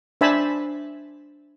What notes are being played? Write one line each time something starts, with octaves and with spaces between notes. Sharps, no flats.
D4 C5 E5 G#5 A5 B5